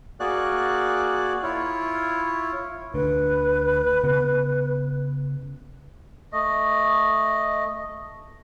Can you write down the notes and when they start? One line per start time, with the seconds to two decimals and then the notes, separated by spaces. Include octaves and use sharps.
0.20 A#3 F#4 G#4 D5 F#6
1.43 E4 F4 C#5
2.94 D2 D3 B4
4.04 C#3 B3
6.32 A3 D#5